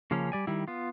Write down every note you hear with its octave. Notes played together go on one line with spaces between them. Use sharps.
C#3 F3 A#3 C#4
G3 D5 G#5
D#3 G3 E4
B3 F4